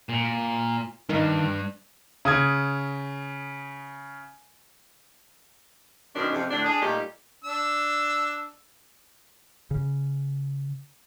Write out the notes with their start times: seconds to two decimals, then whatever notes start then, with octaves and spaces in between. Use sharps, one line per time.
0.09 A#2
1.09 G2 D#3
2.25 C#3 D#6 G#6
6.15 F#2 B2 D#3 C#4 D4
6.33 F2 C3
6.51 A2 D3 D4
6.65 D4 G#4
6.82 A#2 G3 A3 D#4 G4
7.44 D4 E6
9.71 C#3